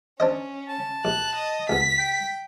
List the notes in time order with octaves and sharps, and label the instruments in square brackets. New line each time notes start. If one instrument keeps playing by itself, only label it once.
[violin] C#4 [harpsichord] D4 C5 D#5
[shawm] A5
[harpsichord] A#1 [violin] F#6
[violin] D#5
[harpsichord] C#2 B3 [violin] B6
[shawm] G5